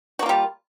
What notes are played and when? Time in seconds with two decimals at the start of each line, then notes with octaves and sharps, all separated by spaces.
0.19 F#4
0.23 A#3
0.26 F4
0.29 G3